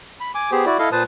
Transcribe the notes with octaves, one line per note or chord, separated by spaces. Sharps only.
B5
G#5 D6
B3 G4 G#4 C5
E4 F#4 D5
E4 A4 D#5 F5
A#2 B4 C5 A5 D#6